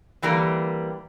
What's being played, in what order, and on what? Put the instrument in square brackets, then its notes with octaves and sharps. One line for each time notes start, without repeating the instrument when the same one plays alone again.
[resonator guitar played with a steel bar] D3 E3 G3 A#3